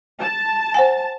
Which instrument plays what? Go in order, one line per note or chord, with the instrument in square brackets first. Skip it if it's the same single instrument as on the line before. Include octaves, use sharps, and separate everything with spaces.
[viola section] A5
[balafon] C5 F#5 G#5